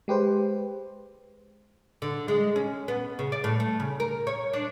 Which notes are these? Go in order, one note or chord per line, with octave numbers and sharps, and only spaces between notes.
G#3 G4 B4 C5
D3
G#3
C#4
B3
C#3
D5
A2
A3
C#3
A#4
C#5
D4